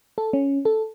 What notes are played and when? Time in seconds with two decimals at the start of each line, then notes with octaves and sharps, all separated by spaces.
0.18 A4
0.33 C#4
0.65 A4